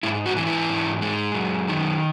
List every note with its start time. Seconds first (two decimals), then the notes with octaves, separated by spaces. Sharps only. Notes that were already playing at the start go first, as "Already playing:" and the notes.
0.03 G#2 E4
0.26 F#4
0.37 E3
0.47 E4
0.69 G#2
1.02 G#3
1.34 F#2
1.68 D#3